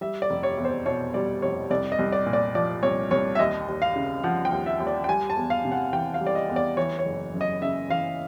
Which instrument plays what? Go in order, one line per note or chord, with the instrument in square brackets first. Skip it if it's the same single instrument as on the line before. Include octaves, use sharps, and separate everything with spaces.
[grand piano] G3 E5
D5
F1
C#5
E2
C5
B2 C#5
G3 D5
F1 C#5
C2 D5
D#5
C2
D5
A#2
D5
F3 D5
C2 C#5
C2 C#5
E5
D#2 D#5
D#2
F5
C#3
F3 F#5
G5
D#2
E5
D#2
D5
G5
G3 G#5
A5
E2
F5
C3
F#5
E3 G5
F5
G3
D5
D#5
E2
D5
E3 C#5
C#5
F#1
F#2
D#5
C#3 E5
E3 F5